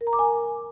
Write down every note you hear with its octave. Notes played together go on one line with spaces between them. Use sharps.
A#4
A#5
D6
G#5